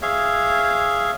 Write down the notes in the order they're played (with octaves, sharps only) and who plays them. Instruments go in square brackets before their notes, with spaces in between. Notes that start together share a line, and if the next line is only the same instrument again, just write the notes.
[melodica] G#4 C#5 E5 F5